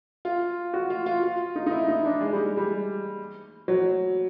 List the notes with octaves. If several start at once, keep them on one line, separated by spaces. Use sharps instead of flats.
F4
F#4
F4
F4
F4
D#4
D#4
E4
D#4
D4
G#3
G3
G3
F#3